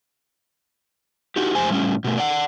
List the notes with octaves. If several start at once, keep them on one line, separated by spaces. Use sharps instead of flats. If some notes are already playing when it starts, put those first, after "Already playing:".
D#4 F#4 G4
F2 G4 C5 G#5
A2 G3 C#4
B2 A3
D5 F#5